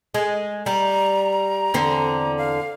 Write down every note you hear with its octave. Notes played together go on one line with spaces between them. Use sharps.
G#3
G3 A#5
E2 D3 C4
F5